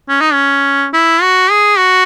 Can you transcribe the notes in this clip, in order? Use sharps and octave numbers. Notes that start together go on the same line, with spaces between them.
C#4
D#4
C#4
E4
F#4
G#4
F#4